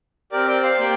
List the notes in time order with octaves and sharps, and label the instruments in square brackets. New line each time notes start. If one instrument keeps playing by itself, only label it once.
[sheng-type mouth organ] C4 G4 A#4 D5
D5 G5
C5 F5
A#3 G4 D5 G5